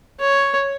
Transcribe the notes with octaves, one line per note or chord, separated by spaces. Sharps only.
C#5